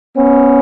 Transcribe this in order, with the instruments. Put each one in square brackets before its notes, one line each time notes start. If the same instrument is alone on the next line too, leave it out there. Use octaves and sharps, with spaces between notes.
[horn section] B3 C#4